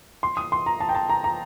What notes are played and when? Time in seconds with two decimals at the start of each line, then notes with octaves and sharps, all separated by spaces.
0.23 C6
0.37 D#6
0.52 C6
0.66 A#5
0.80 A5
0.89 G5
0.95 A5
1.09 A#5
1.24 A#5